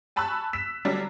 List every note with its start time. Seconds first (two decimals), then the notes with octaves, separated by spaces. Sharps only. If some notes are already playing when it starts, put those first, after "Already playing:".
0.16 G#5 A5 B5 C#6 E6 F#6
0.53 E6 B6 E7
0.85 D3 F#3 G3 D4